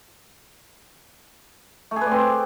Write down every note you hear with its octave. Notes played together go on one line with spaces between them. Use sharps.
A3
G#4
B4
D5
C4